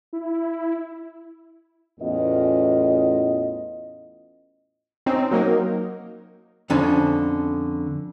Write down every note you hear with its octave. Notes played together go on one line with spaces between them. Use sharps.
E4
E2 A2 B3 C#4 F4 D#5
C4 C#4 D#4
F#3 A#3 D#4 A#4
F2 D3 C#4 G#5 A5